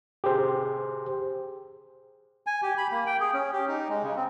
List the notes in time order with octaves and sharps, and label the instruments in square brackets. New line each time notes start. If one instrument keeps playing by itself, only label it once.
[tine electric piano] G4 G#4 C5
[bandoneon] G#5
G4
B5
A#3
G5
G#4
C#4
G4
D#4
G#3
C#3
C4